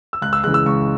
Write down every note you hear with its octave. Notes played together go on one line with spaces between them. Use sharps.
E6
C#2 F#6
E6
C#3 E3 G#3 F#6
E6
C#2 C#6